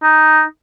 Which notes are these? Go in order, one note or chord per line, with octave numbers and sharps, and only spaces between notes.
D#4